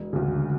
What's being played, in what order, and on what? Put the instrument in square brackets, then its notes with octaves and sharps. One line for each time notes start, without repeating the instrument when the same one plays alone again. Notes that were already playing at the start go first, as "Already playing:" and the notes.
Already playing: [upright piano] E1
D2 C#3